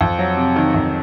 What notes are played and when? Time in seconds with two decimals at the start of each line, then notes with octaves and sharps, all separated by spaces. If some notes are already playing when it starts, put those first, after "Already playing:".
0.01 F2
0.19 F#3
0.37 C3
0.56 D#3
0.74 F2